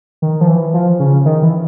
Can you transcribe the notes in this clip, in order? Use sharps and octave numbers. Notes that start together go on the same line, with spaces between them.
D#3
F3
E3
F3
C#3
D#3
E3